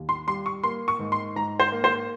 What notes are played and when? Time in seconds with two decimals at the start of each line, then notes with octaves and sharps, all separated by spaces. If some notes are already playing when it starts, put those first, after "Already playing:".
Already playing: D#2
0.09 C6
0.27 G3 C6
0.46 C#6
0.63 A#3 C6
0.88 C#6
0.99 G#2
1.12 C6
1.36 G#2 A#5
1.60 C5
1.72 A#3
1.84 C5